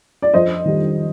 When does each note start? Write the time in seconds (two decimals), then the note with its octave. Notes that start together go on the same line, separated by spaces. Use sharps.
0.22 D5
0.34 F2 C5 D#5
0.65 D#3 G3